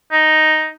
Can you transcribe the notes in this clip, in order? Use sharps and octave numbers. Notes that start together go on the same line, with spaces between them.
D#4